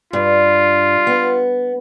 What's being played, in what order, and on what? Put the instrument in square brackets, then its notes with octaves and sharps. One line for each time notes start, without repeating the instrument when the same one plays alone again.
[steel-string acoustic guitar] G2 [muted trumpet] F4
[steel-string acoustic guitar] B3